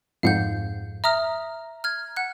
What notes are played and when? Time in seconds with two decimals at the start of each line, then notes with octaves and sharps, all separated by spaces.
0.23 F2 G#2 F5 F#5 G6
1.04 E5 A#5 D#6 F6
1.84 F6 G#6
2.16 F#5 F#6